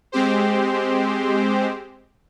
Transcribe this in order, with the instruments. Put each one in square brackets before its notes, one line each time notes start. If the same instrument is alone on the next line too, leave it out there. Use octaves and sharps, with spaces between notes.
[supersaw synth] G#3 C4 G4 C5